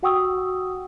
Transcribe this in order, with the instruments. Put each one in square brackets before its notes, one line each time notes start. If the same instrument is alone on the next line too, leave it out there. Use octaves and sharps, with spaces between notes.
[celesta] F#4 F#5 G5 C#6 D#6 E6